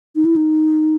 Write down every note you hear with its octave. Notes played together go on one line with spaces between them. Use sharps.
D#4
E4
D#4